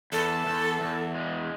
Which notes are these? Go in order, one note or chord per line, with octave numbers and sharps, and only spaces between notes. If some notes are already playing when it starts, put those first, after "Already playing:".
E2 A4
E2
E2
G#3